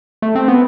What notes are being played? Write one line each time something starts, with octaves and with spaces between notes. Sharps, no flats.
A3
C4
B3